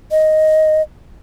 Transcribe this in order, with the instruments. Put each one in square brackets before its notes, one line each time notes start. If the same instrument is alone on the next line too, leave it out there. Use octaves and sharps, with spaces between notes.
[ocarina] D#5